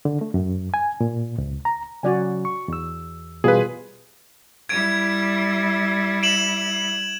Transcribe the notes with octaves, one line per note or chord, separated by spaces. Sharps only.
D3
A3
F#2
G#5
A#2
C#2
A#5
C#3 F#3 C#4 F#4 D5 G#5
C#6
E2 E6
B2 E3 G3 F4 G#4 B4
G3 E4 G#6 D7
D7 E7 F#7